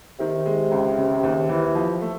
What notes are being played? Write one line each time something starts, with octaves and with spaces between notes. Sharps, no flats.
C3 D#3
G#3
C#2
C#3
D#2
E3
F3
A3